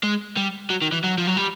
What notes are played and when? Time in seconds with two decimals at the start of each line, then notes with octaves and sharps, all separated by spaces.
0.04 G#3
0.37 G3
0.70 F#3
0.82 D#3
0.92 E3
1.04 F#3
1.18 F3
1.27 F#3
1.37 G3